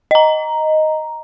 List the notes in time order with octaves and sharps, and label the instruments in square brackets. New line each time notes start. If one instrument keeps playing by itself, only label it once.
[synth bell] D#5 A#5